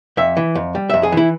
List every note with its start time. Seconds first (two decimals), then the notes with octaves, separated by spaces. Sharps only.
0.17 F2 E5
0.37 E3
0.55 F2
0.75 G3
0.90 F2 E5
1.03 G#4
1.12 E3 E4